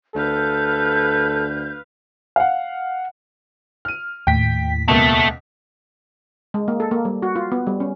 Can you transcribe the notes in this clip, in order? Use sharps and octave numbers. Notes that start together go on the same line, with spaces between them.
D2 A4 B4 F5 G6
F5 F#5
F6 D#7
D#2 A2 G5 B6
C#2 B2 A3 A#3
G#3
A#3
A4
A#3
G3
F#4
F4
B3
G3
C#4